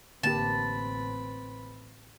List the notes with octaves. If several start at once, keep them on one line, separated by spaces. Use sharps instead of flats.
A1 D3 A#3 C4 G4 B4 A5 B5